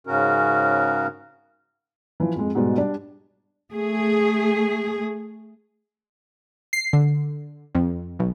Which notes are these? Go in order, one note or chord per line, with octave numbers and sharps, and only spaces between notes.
G#2 C#3 C#4 F#4 A#4
E3 F3
F2 G#3
G#2 B2 G3 G#3
G3 D4 D5
A3 G#4
C7
D3
F2
B1